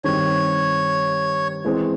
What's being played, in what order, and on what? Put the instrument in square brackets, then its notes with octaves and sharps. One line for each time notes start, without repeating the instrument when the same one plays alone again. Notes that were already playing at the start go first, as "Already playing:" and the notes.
[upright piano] G2 D#3 G3 C4 [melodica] C#5
[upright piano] E3 G#3 C4